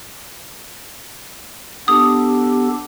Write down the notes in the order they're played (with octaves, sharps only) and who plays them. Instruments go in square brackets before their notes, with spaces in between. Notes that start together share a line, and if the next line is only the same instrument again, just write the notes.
[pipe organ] B3 G4 A4 [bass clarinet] D4 [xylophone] D#6